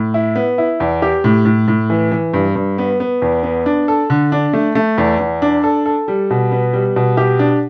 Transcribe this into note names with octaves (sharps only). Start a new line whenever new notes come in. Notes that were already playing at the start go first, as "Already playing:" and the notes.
Already playing: A2
E4
B3
E4
E2
G4
A2
A2
A2
E3
E3
G2
G2
B3
B3
E2
B3
D4
A4
D3
D4
A3
A3
E2
E2
D4
A4
A4
G3
B2
B3
G3
B2
G4
D4